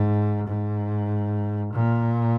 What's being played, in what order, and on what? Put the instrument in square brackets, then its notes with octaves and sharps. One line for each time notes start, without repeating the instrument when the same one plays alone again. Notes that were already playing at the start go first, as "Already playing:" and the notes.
Already playing: [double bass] G#2
G#2
A#2